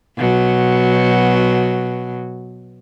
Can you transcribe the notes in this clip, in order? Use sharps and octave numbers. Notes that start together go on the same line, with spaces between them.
B2 F#3